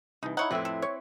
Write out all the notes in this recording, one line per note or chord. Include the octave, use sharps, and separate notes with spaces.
C2 E3 D#4
D#4 E4 C#5 F#5
F2 A2 C4 E4 B4
A4
C#5